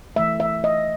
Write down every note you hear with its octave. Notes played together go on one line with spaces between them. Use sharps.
E3 A3 E5
E5
D#5